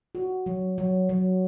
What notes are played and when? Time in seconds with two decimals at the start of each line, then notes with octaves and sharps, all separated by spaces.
0.15 F#4
0.46 F#3
0.78 F#3
1.09 F#3